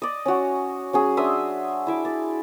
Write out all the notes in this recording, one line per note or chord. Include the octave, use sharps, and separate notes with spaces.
D5 D#5
C#4 F#4
F#3 C#4 G#4
D4 E5 C6 D#6
E4 E5 D6
D5